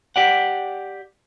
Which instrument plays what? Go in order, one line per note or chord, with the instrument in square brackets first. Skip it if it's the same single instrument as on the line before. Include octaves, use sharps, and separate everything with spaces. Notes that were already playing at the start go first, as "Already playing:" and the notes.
[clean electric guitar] G4 D5 F#5